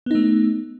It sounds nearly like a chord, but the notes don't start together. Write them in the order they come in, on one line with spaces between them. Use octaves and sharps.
B3 D#4 A3